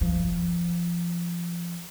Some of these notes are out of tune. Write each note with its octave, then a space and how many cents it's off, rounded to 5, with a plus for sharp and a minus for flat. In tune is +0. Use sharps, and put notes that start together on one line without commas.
F3 -20